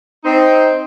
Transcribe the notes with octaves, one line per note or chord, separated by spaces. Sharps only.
C4 D#4